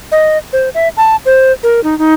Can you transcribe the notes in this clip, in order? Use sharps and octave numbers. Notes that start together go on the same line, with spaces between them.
D#5
C5
E5
A5
C5
A#4
D#4
D#4